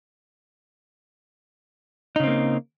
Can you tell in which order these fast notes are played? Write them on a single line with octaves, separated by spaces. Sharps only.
D#4 C#3 C4 A#3